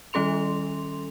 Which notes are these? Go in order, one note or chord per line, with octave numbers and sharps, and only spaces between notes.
D#3 G3 C#4 A4 C6 F7